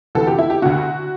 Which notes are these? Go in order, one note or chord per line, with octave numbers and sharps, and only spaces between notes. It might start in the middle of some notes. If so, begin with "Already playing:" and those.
D2 C3 E3 A4
G4
E4
G4
D2 D3 F#4